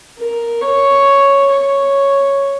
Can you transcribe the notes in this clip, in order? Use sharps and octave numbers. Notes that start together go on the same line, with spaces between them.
A#4
C#5
C#5